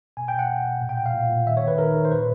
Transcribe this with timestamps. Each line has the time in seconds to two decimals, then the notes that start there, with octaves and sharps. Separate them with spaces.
0.17 B2 G#5
0.28 G5
0.33 B2
0.39 F#5
0.49 B2
0.66 B2
0.81 A#2
0.89 G5
0.97 A#2 F#5
1.06 F5
1.14 A#2
1.30 A#2
1.46 D#3 E5
1.57 C#5
1.62 D#3
1.68 B4
1.78 D#3 A#4
1.95 D#3
2.05 C5
2.11 A#2 B4